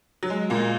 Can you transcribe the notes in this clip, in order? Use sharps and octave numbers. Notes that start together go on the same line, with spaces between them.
F#3
G#3
A#2 A#3